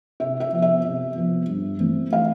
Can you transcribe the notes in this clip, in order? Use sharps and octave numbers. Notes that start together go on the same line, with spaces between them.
C3 E5
E5
F3 B3
E5
C3
F3 B3
G2
E3 A3 C4
F5